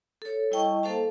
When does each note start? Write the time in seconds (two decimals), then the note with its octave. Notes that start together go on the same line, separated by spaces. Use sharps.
0.22 A4 C#5
0.51 G3 E4 D#5 G5 A5 C#6
0.83 A#3 A4 C5 F5 A5